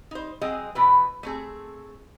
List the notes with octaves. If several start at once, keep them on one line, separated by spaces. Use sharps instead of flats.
D#4 C5
F#3 G#3 C4 G#4 D#5
B2 E3 B4
A3 C4 G#4